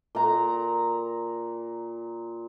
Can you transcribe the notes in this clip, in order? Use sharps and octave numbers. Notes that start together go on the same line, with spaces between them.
A#2 A#5